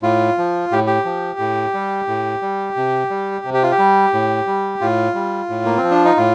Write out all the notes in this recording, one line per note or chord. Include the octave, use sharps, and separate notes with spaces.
A2 F4
F3
A2 G4
G4
F3
A2
G3
A2
G3
C3
G3
C3
G4
F4
G4
G3
A2
G3
A2 F4
G3
A2
A#3
C4
F3
D4
D#4
A2 F4